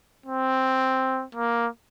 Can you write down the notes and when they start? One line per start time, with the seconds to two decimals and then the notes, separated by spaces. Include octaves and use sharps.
0.26 C4
1.35 A#3